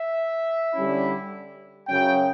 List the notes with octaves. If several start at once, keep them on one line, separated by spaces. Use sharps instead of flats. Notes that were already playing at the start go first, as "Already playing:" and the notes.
Already playing: E5
D3 G3 C#4 E4
F#2 C#3 F#3 C#4 G5